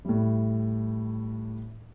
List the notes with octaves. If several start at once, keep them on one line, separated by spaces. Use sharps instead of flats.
A2 G3